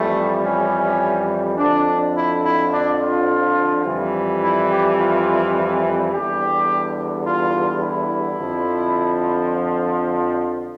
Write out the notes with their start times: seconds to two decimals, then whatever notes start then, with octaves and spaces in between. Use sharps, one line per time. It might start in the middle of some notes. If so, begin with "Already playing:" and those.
Already playing: F2 E3 G3 A3
0.45 C#4
1.58 F2 D3 F3 D4
2.15 E4
2.43 E4
2.71 D4
3.00 F4
3.85 F2 E3 G3
4.41 E4
4.70 G4
4.98 F4
6.12 E2 D3 G3 G4
7.25 F4
7.82 E4
8.38 F2 D3 F3